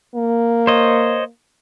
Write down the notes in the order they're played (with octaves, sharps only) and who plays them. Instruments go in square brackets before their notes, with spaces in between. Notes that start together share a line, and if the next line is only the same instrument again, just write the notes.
[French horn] A#3
[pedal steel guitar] C5 C#5 D#5